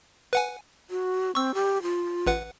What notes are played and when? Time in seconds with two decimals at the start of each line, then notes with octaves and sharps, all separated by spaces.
0.33 B4 F#5 G#5
0.90 F#4
1.35 C4 C#6 E6
1.54 G4
1.82 F4
2.26 A1 B4 F#5